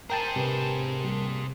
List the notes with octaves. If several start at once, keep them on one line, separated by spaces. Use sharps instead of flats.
G#4 A#4 C5 G5 A5
C3 C4 D4 B4
G3 A#3 G4